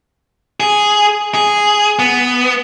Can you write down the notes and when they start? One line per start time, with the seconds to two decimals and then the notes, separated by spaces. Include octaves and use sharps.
0.60 G#4
1.35 G#4
1.99 B3